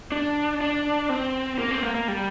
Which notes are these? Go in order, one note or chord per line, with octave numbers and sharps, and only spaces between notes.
D4
D4
C4
A#3
C4
A#3
A#3
G3